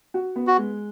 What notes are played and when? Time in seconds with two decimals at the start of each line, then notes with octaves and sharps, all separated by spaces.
0.14 F#4
0.36 B3
0.47 F#4
0.58 G#3